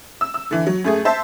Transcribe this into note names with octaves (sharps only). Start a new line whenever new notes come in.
E6
E6
D3 E3
F#3
F#2 A3 G#4
C5 E5 A5